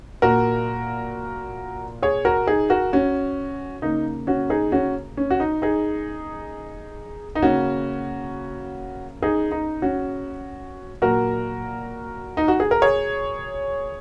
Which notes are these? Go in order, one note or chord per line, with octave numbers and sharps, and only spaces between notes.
A#2 A#3 F#4 A#4
G#4 C#5
F#4 A#4
D#4 G#4
F#4 A#4
C#4 F#4
C#3 A#3 D#4
C#4 F#4
D#4 G#4
C#4 F#4
C#4
F#4
D#4
D#4 G#4
D#4
C#3 A#3 C#4 F#4
D#4 G#4
D#4
C#4 F#4
A#2 F#3 A#3 F#4 A#4
D#4
F#4
G#4
A#4
G#4 C#5